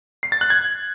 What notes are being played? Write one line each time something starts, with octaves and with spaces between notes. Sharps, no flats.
C7
A6
F#6
G#6